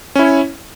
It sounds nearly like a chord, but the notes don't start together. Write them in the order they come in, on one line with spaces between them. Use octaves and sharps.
C#4 E4 C#5